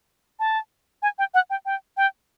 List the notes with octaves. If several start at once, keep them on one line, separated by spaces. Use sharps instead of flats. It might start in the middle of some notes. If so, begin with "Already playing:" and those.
A5
G#5
G5
F#5
G5
G5
G5